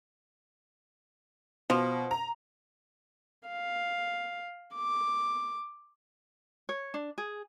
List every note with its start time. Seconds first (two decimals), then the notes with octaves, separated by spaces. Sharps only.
1.70 B2 F3
2.11 A#5
3.48 F5
4.75 D6
6.69 C#5
6.94 D4
7.18 G#4